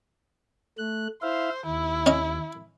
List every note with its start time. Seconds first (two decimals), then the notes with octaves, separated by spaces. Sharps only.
0.78 A3 F#6
1.22 E4 C5 E5 F5
1.66 D#2 E4
2.06 C#4 D#5